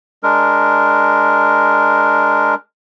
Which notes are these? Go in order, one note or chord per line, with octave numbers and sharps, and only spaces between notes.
G#3 D4 A#4